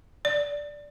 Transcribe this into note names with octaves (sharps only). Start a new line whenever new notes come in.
D5